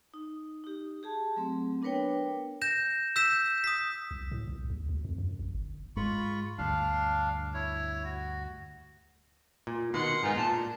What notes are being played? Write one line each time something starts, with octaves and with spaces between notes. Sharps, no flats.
D#4
D#4 G4
G4 G#4 A5
F#3 A3 C4
B3 D4 A#4 B4 C#5 G5
G6 A#6 E7
E6 G6 B6 E7
D#6 B6
C2
A2
C2
D#2
D2
F2
F#2
A#1
G1
G#2 G#3 F4 B5 C#6
D2 G2 D4 F5
E4 C#5
F#4
A#2
B2 D#3 F#5 C6
G#2 B3 D#4 F4 G#4
A#2 A5
D4